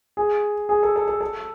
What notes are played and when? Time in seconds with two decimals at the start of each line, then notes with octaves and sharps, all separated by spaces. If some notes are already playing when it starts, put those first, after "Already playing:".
0.17 G#4
0.69 G#4
0.83 A4
0.96 A4
1.08 A4
1.21 A4